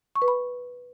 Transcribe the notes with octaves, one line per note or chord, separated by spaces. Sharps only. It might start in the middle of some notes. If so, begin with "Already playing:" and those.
C#6
B4
B5